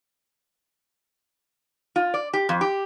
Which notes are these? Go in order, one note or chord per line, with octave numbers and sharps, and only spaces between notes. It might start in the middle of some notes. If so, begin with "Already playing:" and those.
F4
D5
G4
F2
G4